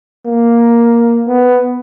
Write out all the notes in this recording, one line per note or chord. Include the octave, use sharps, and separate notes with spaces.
A#3
B3